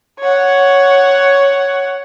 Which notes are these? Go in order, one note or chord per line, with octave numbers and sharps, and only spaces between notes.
C#5 F#5